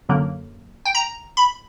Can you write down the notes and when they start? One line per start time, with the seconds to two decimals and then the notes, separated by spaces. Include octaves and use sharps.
0.09 F#2 D3 F#3 A#3
0.85 G5
0.95 A#5
1.37 B5